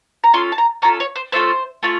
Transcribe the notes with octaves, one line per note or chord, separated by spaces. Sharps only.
A#5
C#4 F4 A4 C6
A5
A#5
C#4 F4 A4 A#5
C#5
C5
A3 C#4 F4 A4 C5
A3 C#4 F4